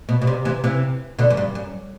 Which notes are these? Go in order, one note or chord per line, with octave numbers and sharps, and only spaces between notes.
B2
B2
C3
C3 E3
C3 E3
B2 D3
F#2
G2
F#2